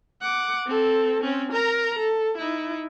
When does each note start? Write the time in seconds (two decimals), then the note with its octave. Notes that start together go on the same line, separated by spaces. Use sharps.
0.21 F#5 D6
0.67 C4 A4
1.22 C4 C#4
1.52 A#4 A#5
1.99 A4
2.38 D#4 E4